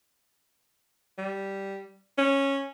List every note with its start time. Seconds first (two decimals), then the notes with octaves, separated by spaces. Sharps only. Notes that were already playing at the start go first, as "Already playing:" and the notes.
1.18 G3
2.18 C#4